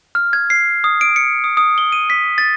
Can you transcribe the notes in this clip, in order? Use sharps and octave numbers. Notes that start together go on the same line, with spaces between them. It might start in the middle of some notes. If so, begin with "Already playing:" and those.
F6
G#6
C7
D#6
D7
C#7
D#6
D#6
G7
D#7
B6
A6